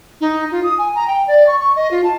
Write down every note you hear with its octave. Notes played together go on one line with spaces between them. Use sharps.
D#4
F4
D#6
G#5
A#5
G5
D5
C#6
C#6
D#5
F4
A5